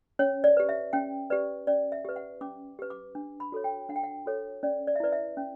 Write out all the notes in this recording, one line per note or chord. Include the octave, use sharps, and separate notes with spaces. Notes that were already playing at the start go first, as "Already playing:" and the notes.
C#4 C#5
D5
G4 B4
E5
C#4 G5
G4 B4 D5
C#4 D5
E5
G4 B4
F#5
C#4 D6
G4 B4
D6
D4
B5
F#4 A4 C#5
G5
D4 F#5
G5
F#5
F#4 A4 C#5
C#4 D5
D5
E5
E4 B4 D5
E5
C#4